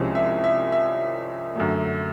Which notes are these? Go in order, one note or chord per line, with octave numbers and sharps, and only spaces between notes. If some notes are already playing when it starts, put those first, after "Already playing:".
Already playing: C2 C3 F3 G#3 C#4
E5
E5
E5
F#2 D3 F#3 A3